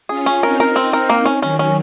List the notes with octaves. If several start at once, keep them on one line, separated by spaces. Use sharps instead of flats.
C#4 F4 G#4
C#4
C4 D#4 A#4
A#4
C4
A#4
A#3
C#4
D#3 F#3 C#4
C#4